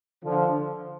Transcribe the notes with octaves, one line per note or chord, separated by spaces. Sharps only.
D3 F3